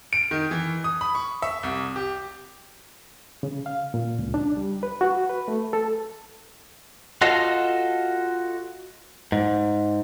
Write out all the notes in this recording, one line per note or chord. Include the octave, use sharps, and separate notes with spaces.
D7
D#3
E3
D#6
B5
C#6
E5
C2
G4
C#3
F5
A#2
C#2
D4
G3
B4
F#4
B4
A3
A4
F4 F#4 A4 D#5 F5
G#2